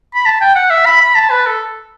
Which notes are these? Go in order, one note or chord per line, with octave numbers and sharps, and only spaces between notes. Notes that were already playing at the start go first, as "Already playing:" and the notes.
B5
A5
G5
F#5
E5
B5
B5
A5
B4
A4